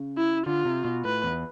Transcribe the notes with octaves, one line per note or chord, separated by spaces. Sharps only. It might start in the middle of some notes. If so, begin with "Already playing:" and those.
Already playing: C#3
E4
D3 F4
C3
B2
A2 B4
E2